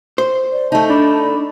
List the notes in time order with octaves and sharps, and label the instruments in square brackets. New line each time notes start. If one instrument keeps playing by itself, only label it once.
[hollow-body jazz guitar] C5
[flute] D5
[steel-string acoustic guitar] A3 D#4 [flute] A5
[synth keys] D4 [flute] B5